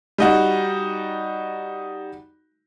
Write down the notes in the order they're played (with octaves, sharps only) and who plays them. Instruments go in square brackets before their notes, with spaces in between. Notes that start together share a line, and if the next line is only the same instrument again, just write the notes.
[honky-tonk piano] G3 D#4 F#4